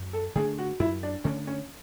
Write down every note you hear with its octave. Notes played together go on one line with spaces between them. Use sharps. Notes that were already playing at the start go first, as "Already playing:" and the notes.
Already playing: F#2
A4
D3 A3 D4 G#4
F#4
F#2 E4
D4
D3 A3 C#4 D4
C#4